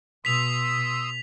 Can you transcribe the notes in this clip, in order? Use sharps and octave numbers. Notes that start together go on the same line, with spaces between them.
B2 C6 D#6 E6 B6 F7